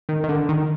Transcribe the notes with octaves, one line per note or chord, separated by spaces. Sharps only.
D#3
D#3
D3
D#3